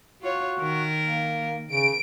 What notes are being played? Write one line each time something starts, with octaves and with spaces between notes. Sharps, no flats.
F4 F#4 C#5
D#3 A#4
A#3
C#3 D7